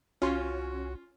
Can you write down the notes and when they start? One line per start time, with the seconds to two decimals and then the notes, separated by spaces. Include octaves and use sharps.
0.22 C2 C#4 F4 F#4 C6